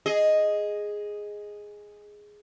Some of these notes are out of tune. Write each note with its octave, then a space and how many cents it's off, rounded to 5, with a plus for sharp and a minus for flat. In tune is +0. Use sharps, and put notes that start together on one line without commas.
G#4 +0 D#5 +0